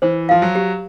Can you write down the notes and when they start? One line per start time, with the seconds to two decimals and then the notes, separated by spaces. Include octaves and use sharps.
0.02 E3 C5
0.29 F3 F5
0.42 F#3
0.55 G4